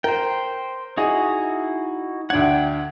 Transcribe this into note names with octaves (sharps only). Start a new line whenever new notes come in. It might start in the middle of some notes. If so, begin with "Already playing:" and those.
A#4 C5 G5
D#4 E4 F#4 G#4 D#5
D2 D4 F#5 G5 G#6